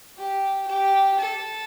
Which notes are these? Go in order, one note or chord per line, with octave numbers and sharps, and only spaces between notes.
G4
G4
A4